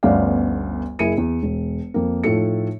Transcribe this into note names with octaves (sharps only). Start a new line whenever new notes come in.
G1 D2 B3 C#4 D5 F5
F#1 E4 G#4 A#4 C#7 D#7
E2
E1
F2 A#3
A2 F3 D#4 A4 C#7